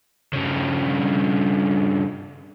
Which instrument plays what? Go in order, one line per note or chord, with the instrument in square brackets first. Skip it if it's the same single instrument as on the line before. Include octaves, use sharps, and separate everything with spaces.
[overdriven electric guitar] G2 C#3